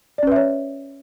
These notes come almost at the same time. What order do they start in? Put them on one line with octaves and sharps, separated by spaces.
D5 C#4 B4 E5 C#5